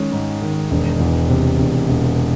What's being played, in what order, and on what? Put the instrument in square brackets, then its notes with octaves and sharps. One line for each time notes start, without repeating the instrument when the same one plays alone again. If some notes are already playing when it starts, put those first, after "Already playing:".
Already playing: [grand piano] D#3 G#3 C#4
G#2
D#3
E1
E2
C3
E1
E1